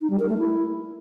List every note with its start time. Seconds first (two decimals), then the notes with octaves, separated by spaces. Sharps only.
0.01 D#4
0.10 G3
0.19 A#4
0.29 A3
0.38 E4